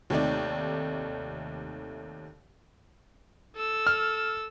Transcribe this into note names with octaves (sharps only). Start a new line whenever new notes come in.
D#2 C3 A3 D#4 D5
A4 E6
F6